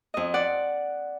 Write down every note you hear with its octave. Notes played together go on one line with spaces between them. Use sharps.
F2 D#5
D5 F#5